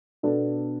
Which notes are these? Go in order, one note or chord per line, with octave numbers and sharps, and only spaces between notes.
B2 B3 D4 A4